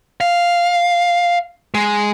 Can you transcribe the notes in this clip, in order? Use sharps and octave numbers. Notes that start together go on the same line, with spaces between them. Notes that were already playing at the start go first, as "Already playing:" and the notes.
F5
G#3